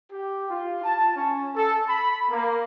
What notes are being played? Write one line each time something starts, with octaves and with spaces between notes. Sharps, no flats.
G4
F4
A5
C#4
A4
B5
A#3